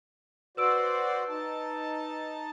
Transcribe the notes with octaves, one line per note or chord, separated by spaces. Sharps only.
F#4 B4 C5 D5 E6 D7
D#4 A5